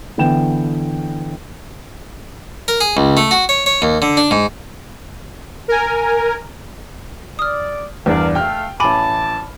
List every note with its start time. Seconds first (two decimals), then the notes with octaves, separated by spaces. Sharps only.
0.18 D3 E3 B3 G5 E7
2.68 A#4
2.81 G#4
2.97 C#2
3.17 A3
3.31 F#4
3.49 C#5
3.66 C#5
3.82 D#2
4.02 D3
4.17 D4
4.31 G#2
5.68 A#4 G#5
7.39 D5 D#6 F6
8.06 E2 G2 D4 A#4 D5 F5
8.35 A3 F5 G5 F6
8.80 A1 G#5 A5 B5 D6